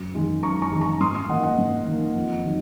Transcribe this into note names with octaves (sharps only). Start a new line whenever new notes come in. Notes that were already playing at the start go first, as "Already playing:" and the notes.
Already playing: F#2
D#3 G#3
F#2 A#5 C#6
A#5 C#6
D#3 G#3
A#5 C#6
G#2 C6 D#6
C6 D#6
D#3 A#3 D#5 F#5
D#5 F#5
G#2
D#3 A#3
F2
D#3 F#3